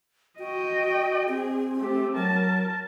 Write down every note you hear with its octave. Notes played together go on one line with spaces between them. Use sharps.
F#4 D#5 G5
C4 G#4
A3 G4
F#3 A#4 A5